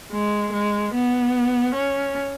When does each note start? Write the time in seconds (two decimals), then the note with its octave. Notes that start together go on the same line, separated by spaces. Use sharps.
0.12 G#3
0.53 G#3
0.94 B3
1.75 C#4